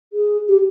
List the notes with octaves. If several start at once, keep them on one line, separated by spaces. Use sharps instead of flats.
G#4
G4